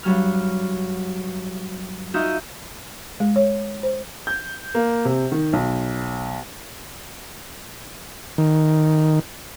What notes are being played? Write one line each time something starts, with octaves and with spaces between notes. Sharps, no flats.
G2 F#3 F6
D#4 F4 F#4 E5 D#6 G6
G#3
C#5
C5
G6
A#3
C3
D#3
B1
D#3